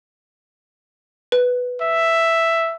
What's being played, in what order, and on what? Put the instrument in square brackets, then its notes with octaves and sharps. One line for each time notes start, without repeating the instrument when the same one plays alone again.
[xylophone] B4
[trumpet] E5